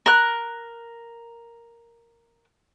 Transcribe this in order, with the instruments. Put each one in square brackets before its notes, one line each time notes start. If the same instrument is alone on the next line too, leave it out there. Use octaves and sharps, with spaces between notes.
[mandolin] A#4 F#6